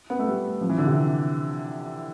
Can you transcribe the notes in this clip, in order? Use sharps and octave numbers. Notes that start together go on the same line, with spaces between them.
B3
A3
G3
F3
E3
D3
C3